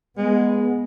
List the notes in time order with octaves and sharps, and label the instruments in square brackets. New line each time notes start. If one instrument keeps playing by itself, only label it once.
[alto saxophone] G#3 [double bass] B3